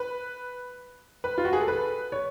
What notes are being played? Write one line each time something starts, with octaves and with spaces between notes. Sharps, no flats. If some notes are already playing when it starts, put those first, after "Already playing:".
Already playing: B4
B4
F4
F#4
G#4
A4
B4
C#5